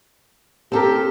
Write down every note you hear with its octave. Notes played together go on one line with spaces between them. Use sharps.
C4 G4 A4 A#4